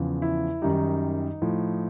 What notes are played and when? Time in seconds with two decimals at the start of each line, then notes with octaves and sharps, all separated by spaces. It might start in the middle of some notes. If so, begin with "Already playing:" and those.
Already playing: E2 C#3 F3
0.22 E4
0.62 F#2 D#3 G3 D#4
1.42 A2 F3